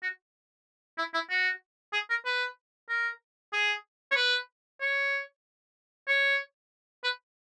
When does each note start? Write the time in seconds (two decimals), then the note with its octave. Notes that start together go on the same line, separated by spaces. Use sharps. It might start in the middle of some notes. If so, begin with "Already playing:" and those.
0.02 F#4
0.98 E4
1.14 E4
1.30 F#4
1.93 G#4
2.10 A#4
2.25 B4
2.89 A#4
3.53 G#4
4.12 C#5
4.16 B4
4.81 C#5
6.08 C#5
7.04 B4